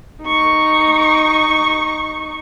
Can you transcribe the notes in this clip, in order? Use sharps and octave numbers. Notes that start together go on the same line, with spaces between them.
D#4 C#6